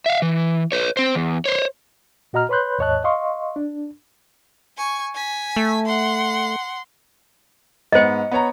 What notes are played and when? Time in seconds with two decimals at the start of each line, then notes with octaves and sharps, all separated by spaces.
0.06 E5 F5
0.22 E3
0.72 B4 C#5
0.97 C4 C5
1.15 E2
1.45 C5 C#5
2.33 A#2 F#4 D#5 A#5 F6
2.49 B4 C#5 B5 C6 F#6 G6
2.79 D#2 G#2 C#5 D#5 A5 F#6
3.04 D#5 F5 C6 C#6
3.56 D4
4.77 G#5 C#6
5.15 G#5 B6
5.56 A3
5.85 F#5 C6
7.92 G#2 B3 C5 D#5 C#7
8.32 B3 C#5 A#5